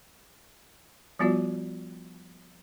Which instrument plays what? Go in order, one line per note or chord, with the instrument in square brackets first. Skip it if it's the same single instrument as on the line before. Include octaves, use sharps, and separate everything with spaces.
[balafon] F3 G3 B3 F4 F#4 D5